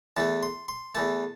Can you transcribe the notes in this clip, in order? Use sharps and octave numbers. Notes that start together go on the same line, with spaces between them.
E2 E3 A3 A5
C6
C6
E2 E3 A3 A5